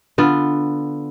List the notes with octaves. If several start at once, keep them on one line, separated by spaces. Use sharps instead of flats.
D3 B3 F4